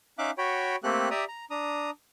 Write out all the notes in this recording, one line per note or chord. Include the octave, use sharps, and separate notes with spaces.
C#4 D#4 E5 F5 D6 F#6
F#4 C#5 G5 B5
A3 A#3 C4 G4 A4 F#6
G4 D5 E5 A#5 D#6
A#5
D4 A#5 D#6